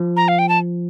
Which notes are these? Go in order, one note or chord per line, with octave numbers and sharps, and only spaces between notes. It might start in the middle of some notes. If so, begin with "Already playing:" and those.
Already playing: F3
A#5
F5
G5
A5